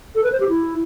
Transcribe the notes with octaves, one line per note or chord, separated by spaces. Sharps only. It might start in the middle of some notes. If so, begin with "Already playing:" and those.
A4
B4
C5
G4
E4